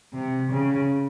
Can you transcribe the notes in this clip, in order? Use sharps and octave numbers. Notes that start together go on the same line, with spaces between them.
C3
C#3